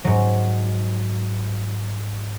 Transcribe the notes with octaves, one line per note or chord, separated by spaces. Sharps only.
G#2 F#3